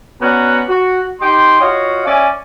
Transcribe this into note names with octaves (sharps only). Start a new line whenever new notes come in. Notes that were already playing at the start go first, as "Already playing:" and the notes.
B3 C#4 F#4 D5 F#5 A#5
F#4
D#4 G4 D#5 G5 C6
F4 F#4 C#5 D#5 F5
C#4 D5 E5 G#5